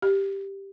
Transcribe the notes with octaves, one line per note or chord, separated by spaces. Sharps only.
G4